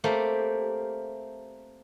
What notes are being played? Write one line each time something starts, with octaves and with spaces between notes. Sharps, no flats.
A3 A#3 C4 G4